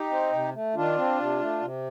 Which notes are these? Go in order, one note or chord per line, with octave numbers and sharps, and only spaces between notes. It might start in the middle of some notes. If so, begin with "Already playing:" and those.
Already playing: D#4 G4
C4
C3
A3
D#3 D4 F4
C4
C3
A3
C3